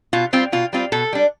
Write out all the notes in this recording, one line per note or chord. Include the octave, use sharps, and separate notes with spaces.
B2 F4
G3 C4 F4
B2 F4
G3 C4 F4
B2 A4
G3 D4